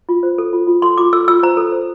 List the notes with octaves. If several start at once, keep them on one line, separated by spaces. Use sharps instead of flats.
F4
C5
A4
F4
F4
A4 C6
F4 D6
A4 E6
F4 E6
C5 A#5
A4
C5